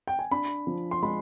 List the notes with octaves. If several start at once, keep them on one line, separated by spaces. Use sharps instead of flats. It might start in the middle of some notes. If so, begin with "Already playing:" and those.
G5
G#5
D4 B5
F3
C6
G#3 B5